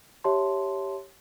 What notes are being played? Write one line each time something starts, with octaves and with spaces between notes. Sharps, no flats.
G4 C#5 E5 A5 C6